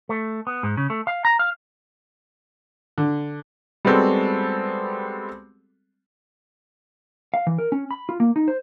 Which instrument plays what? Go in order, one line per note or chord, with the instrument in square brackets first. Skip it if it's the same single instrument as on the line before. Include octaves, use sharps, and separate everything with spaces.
[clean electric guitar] A3
B3
G#2
C#3
A3
F5
A#5
F5
[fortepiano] D3
[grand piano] G3 G#3 B3 C4 F#4 A4
[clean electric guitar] F5
E3
A#4
C#4
B5
F4
A#3
D#4
C5